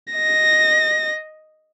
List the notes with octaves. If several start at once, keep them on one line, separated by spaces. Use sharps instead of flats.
D#5 A#6